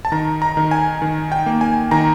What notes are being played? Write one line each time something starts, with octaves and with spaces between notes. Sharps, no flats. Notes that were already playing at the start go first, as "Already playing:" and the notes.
A5
D#3 A#5
A#5
D#3
G#5
D#3
G5
A#3
G#5
D#3 A#5